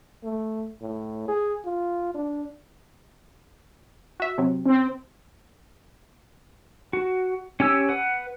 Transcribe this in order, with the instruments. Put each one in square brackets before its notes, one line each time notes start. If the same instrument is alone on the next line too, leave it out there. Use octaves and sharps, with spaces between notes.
[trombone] A3
A2
G#4
F4
D4
[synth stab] F#4 E5
C3 F#3 C4
[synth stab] C#3 [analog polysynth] C4
[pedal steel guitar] F#4
C#4 G4 G#5 E6
B4 F#5